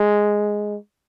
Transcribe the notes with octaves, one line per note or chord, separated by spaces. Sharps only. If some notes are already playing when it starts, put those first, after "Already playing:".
Already playing: G#3